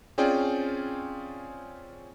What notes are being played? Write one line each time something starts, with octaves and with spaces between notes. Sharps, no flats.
C4 C#4 F4 G#4 D5 G5